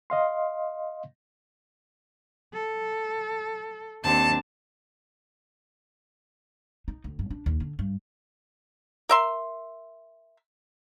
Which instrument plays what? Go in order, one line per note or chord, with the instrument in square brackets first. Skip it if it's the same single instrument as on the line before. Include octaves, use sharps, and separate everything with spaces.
[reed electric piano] D#5 F5 C6
[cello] A4
[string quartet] D#2 A5 [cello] C4 D4
[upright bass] D#4
D2
G2
D4
D#2
D3
G2
[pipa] A#4 E5 C6